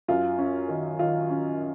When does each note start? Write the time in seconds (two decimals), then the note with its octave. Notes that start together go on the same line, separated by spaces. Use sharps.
0.08 F#2 F4
0.38 C#4
0.68 D#3
0.99 D#3 F4
1.30 C#4